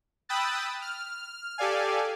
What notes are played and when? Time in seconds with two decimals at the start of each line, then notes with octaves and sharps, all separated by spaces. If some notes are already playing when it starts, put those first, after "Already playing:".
0.29 G5 B5 D#6 E6 F#6 A6
0.82 F6
1.58 G4 A4 D5 F5 G#5